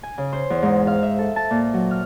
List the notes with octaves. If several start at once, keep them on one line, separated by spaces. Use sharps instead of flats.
G#5
C#3
C5
E2
G#2
F5
E5
A4
A5
A#2
F#3
F6